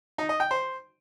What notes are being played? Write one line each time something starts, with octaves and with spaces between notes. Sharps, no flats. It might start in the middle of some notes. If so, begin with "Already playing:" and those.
D#4
D#5
G5
C5